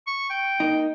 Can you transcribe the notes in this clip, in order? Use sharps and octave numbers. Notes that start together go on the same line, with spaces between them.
C#6
G5
A#3 D#4